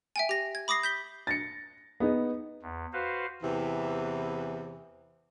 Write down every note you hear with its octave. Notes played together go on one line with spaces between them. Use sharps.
E5 G5 G#5
G4 A#6
G#6
B5 D6 D#6 A#6 C7
G6 B6 G7
A6 A#6 C#7
B3 D#4 G#4
E2
F#4 B4 C5 F5
E2 C3 E3